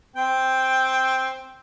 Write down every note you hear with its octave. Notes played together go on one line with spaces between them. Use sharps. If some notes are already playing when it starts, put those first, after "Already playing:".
C4 G5